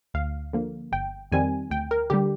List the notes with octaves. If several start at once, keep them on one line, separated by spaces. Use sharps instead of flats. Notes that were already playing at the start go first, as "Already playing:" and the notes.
D2 F5
D3 F3 A#3
G1 G5
F2 D#3 G3 C4 G#5
D2 G5
A#4
D3 G3 G4